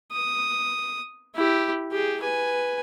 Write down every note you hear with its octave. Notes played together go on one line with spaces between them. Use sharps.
D#6
E4 G4
G4 G#4
B4 G#5